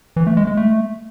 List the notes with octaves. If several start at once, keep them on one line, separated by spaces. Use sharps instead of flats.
E3
A3
G#3
G#3
A3